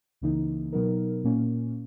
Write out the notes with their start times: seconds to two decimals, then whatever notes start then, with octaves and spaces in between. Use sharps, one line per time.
0.21 C#2 C#3 E3 A#3 D#4
0.72 B2 F#3 B3 D#4 A#4
1.24 A#2 A#3 C#4